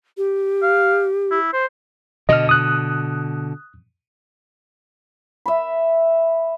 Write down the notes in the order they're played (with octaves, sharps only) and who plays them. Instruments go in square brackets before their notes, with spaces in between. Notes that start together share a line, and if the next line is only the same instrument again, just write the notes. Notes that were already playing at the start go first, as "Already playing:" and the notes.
[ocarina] G4
[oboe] F5
E4
C5
[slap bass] B2 D3 [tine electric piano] D#5 F6
[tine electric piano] D#6 F#6
[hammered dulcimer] E5 B5